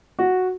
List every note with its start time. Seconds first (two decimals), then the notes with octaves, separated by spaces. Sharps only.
0.19 F#4